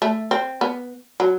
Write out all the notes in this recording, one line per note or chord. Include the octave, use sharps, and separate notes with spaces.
A3
C4
B3
F#3